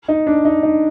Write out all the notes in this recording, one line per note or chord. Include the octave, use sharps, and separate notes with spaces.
D#4
D4
D#4
D#4